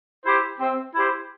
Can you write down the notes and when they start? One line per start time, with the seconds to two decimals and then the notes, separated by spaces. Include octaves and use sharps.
0.26 E4 G4 C5
0.60 C4
0.95 E4 G4 C5